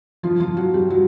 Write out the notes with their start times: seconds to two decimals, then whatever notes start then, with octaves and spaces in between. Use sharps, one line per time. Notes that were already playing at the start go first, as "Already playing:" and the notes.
0.23 F3 F4
0.40 F3 F4
0.57 F#3 F#4
0.74 G3 G4
0.90 F#3 F#4